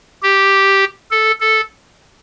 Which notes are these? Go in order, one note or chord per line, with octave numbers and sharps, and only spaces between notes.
G4
A4
A4